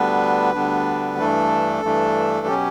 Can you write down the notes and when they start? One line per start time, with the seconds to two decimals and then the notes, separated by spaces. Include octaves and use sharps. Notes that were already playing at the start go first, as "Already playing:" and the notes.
Already playing: D2 D3 G3 B3 D4 B4
0.54 D2 D3 G3 B3 D4
1.18 G2 E3 A3 D4 A4
1.83 G2 E3 A3 D4
2.47 B2 F#3 C#4 G4